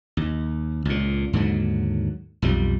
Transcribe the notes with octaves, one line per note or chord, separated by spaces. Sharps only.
D#2
C#2 A#2
D#2 G#2 D3 F#3
B1 F2 G3